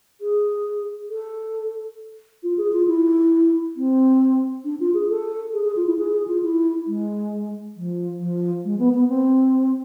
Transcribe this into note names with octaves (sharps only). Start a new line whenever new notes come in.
G#4
A4
F4
G#4
F4
E4
C4
D4
F4
G#4
A4
G#4
G#4
F4
E4
G#4
G#4
F4
E4
G#3
F3
F3
G#3
B3
B3
C4